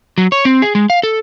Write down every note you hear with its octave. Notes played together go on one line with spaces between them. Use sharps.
F#3
C#5
C4
G#4
G#3
F5
A4